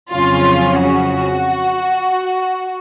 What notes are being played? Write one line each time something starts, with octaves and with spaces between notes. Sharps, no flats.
F2 C#3 F#3 C#4 F4
F#4